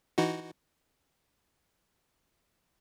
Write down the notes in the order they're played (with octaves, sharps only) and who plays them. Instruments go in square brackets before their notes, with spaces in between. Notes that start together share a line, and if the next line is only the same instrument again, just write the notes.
[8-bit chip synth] E3 D#4 F#4